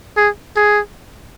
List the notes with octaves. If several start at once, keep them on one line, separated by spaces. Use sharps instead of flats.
G#4
G#4